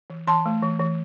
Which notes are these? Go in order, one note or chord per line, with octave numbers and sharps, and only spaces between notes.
E3
E3 A5 C6
A3
E3
E3